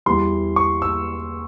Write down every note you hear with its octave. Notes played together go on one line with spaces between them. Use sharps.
E2 E3 G3 C6
C#6
E6